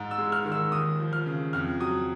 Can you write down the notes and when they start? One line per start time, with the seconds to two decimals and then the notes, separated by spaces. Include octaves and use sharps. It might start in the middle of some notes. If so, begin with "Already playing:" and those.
Already playing: G#2
0.11 E6
0.18 G#3
0.32 F6
0.45 D#3
0.52 E6
0.72 D#2 D#6
1.00 F3
1.13 F6
1.26 C#3
1.53 F2 F6
1.80 F#3 D#6